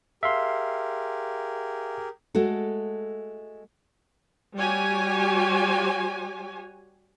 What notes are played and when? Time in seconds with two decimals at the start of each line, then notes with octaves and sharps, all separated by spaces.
0.23 G4 G#4 A#4 E5 F5 C6
2.35 G#3 A3 F#4 A4
4.57 G3 F#4 G4 C#5 G#5